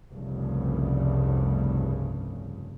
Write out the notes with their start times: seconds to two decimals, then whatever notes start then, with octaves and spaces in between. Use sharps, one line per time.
0.11 F1 C2 G2 C#3